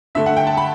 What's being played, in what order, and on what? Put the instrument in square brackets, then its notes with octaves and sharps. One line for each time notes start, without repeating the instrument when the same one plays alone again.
[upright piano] G2 D3 A3 [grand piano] E5
[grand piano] F#5
G5
A5
B5